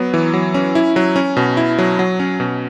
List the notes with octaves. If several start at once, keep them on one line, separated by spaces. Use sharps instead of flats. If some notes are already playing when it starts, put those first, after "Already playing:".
Already playing: F#3 B3
E3
F#3
C#4
E4
F#3
C#4
B2
E4
F#3
F#3
C#4
B2